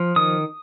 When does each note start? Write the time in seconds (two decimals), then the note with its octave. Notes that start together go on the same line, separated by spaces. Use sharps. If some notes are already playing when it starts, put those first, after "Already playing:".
Already playing: F3
0.16 D#3 D#6